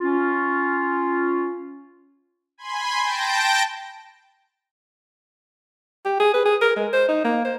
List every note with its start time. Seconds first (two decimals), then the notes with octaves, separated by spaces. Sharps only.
0.01 C#4 F4
2.58 G#5 B5 C6
3.00 G5 A5 G6 A#6 D7
6.05 G4
6.20 G#4
6.34 B4
6.46 G#4
6.62 A#4
6.76 G#3
6.93 C5
7.08 D#4
7.24 A#3
7.45 C5